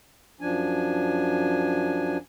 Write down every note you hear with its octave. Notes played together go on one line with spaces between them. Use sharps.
F#2 F3 D4 G#5